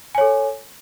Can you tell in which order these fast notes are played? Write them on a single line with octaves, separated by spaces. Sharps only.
G#5 C#5 A4